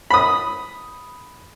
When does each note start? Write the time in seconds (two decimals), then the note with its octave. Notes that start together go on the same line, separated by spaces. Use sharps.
0.10 B5 D#6